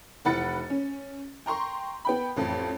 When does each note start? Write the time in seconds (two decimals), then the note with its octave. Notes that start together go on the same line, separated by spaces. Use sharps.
0.25 F1 E3 F#5 B5 A6 C#7
0.70 C#4
1.46 G5 A#5 C6 C#6
2.05 B3 G5 B5
2.36 A1 F2